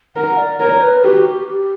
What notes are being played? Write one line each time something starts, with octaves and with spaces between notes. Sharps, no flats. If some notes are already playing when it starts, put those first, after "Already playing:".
A#4 F#5
D5
A#4 C#5
B4
F#4 G4
G4
G4